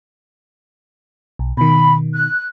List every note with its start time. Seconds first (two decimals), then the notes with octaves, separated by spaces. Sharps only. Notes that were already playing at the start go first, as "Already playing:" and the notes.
1.39 B1
1.57 B2 D#3 B5
2.14 F#6